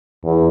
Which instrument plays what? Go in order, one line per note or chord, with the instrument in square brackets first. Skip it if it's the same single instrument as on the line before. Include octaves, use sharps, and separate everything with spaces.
[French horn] E2